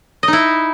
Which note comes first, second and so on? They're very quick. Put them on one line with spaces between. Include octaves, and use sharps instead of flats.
D#5 D#4 E4